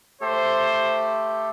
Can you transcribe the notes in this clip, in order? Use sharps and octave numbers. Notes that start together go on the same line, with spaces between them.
A3 G4 A4 C5